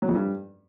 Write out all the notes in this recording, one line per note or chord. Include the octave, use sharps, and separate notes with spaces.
F#3
F2
G2